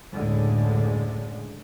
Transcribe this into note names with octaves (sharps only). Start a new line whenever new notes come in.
F#1 D2 A2 D3 G#3